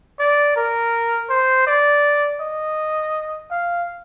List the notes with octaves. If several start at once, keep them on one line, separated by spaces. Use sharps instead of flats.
D5
A#4
C5
D5
D#5
F5